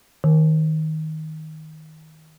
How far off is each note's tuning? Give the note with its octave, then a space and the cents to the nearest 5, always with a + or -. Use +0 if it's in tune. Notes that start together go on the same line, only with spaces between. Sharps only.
D#3 +10